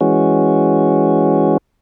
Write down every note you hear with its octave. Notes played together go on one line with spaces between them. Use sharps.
E3 G#3 C#4 F#4